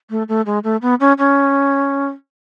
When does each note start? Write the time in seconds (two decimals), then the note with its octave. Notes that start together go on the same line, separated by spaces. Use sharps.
0.10 A3
0.29 A3
0.46 G#3
0.64 A3
0.82 B3
1.00 C#4
1.18 C#4